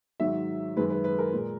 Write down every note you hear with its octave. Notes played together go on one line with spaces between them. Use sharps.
G#2 D#3 F#3 E5
F#2 D#3 G#3 B4
B4
B4
A#4
A#2 G#3